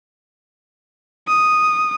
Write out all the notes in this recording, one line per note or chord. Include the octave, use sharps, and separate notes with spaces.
D#6